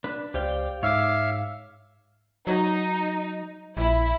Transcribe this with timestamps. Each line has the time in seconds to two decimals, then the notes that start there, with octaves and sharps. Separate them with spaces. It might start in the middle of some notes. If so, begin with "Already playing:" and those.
0.04 D4 B4
0.34 C#2 G4 C5 D5 F5 G5
0.83 G#2 C#5 E5 F5 D6
2.47 F#3 D#4
3.77 A#1 E4